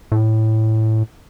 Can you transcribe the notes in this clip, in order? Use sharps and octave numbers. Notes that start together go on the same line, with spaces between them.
A2